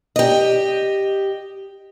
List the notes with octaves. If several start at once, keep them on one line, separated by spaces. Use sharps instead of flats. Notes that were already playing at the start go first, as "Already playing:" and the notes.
G4 D#5